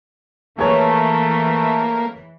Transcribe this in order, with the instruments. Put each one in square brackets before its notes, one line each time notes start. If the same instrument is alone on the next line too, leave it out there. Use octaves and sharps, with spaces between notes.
[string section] E3 [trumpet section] A3 [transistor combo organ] A#3 [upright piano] G#4 B4 C#5